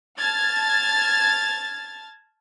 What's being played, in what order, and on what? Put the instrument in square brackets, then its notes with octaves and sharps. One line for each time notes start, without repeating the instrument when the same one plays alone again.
[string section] A5 F6 G#6 A6